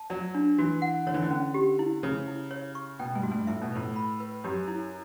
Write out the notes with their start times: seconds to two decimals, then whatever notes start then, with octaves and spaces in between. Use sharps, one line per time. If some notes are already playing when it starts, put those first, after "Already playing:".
Already playing: A5
0.10 F#3 D5
0.35 D4
0.58 E3 F#4
0.82 F#5
1.07 D3 C#5
1.14 E3
1.22 D3
1.31 C#4
1.54 G4
1.79 E4
2.03 C#3 C#5
2.27 E4
2.51 C#5
2.75 C#6
2.99 B2 G5
3.16 G2
3.23 F#4
3.32 G2
3.47 A2 E5
3.61 B2
3.72 A2 B4
3.96 B5
4.20 B4
4.44 F#2 G4
4.68 E4